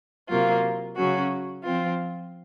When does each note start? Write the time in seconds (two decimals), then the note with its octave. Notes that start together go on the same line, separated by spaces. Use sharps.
0.30 C3 F#3 A#3 F4
0.96 C#3 F#3 C#4 F#4
1.64 F3 C4 F4